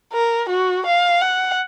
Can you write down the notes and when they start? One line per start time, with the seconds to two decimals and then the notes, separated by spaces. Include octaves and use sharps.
0.12 A#4
0.49 F#4
0.86 F5
1.21 F#5